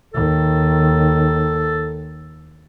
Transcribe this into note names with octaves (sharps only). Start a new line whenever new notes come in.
D#2 D#3 A4